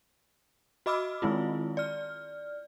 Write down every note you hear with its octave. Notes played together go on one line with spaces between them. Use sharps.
F#4 D#5 B5 D6 E6 F6
D#3 G#3 C4 E4 F4
D5 F6